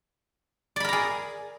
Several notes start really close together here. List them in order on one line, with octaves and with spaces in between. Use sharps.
D5 B5 A#4 A#5 G#4